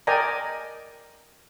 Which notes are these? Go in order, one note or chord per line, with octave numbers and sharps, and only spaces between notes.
A#4 D5 D#5 G5 G#5 A#5